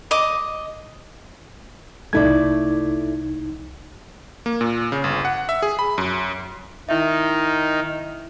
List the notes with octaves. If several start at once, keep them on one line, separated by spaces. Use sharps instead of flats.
D#5 D6
C2 A3 D#4 E4 D5 G#6
A#3
A#2
C#3
G1
F#5
E5
G#4
B5
F#2
D#3 D#4 E4 E5